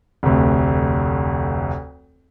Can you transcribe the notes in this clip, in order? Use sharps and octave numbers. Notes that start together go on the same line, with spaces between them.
F1 D2